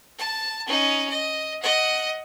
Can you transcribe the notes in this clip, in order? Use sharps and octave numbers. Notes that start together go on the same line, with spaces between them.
A5
C#4 D#4
D#5
D#5 F#5